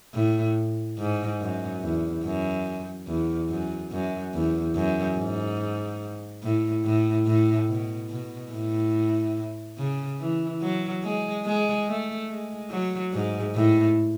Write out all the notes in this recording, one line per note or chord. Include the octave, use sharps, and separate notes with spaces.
A2
G#2
F#2
E2
F#2
E2
F#2
F#2
E2
F#2
G#2
A2
A2
A2
B2
B2
A2
C#3
E3
F#3
G#3
G#3
A3
G#3
F#3
G#2
A2